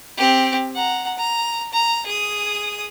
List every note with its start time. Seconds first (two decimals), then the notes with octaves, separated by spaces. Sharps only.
0.17 C4 G4
0.75 F#5 A#5
1.18 A#5
1.73 A#5
2.06 G#4 D#6